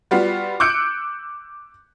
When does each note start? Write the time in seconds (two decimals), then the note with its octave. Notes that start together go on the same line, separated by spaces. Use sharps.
0.11 G3 B3 F4 F#4
0.60 D6 E6 F#6 G6 C#7 D7